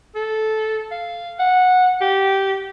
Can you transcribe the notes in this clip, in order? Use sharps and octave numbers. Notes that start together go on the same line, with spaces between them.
A4
F5
F#5
G4